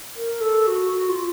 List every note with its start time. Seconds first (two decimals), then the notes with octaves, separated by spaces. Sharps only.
0.16 A#4
0.41 A4
0.67 F#4
0.93 F#4
1.09 F4